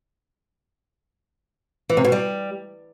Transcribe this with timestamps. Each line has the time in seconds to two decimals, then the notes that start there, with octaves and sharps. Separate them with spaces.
1.89 E3
1.97 C3
2.05 B2
2.12 G3